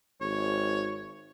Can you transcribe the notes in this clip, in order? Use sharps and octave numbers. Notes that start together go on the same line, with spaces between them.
G#1 C#5